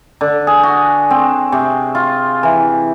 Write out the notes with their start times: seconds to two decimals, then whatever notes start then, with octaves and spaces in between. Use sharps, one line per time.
0.21 D3
0.47 G#4
0.63 F#4
1.11 C4
1.52 C3
1.95 F4
2.43 E3